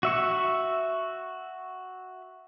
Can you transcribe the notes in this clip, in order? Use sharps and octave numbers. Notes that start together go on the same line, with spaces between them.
F#4 E5 C#6